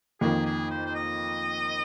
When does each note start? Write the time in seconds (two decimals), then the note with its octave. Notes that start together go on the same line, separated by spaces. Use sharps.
0.21 F2 D#3 A#3 G#4
0.46 G#4
0.71 C5
0.86 C5
0.95 D#5